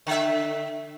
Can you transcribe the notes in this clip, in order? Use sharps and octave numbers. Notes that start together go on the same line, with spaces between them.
D3 E5